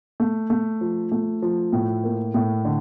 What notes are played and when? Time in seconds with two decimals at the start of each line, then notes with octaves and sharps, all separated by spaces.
0.20 A3
0.50 A3
0.81 F3
1.12 A3
1.42 F3
1.72 A2
2.04 A#3
2.34 A2
2.65 D3